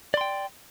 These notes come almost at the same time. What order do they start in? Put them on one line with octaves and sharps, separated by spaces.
D5 C6 G5